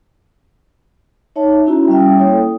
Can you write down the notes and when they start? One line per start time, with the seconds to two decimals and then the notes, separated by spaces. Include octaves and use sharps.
1.36 D#4 C#5 E5 A5
1.66 C#4 E4 F#4 E5 A#5
1.88 G3 C#4 E5 G5
2.19 A#3 E4 C#5 G5 D#6
2.31 A4